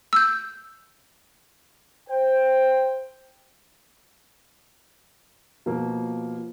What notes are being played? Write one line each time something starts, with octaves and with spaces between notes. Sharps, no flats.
E6 G6
C5 G5
B2 F3 A#3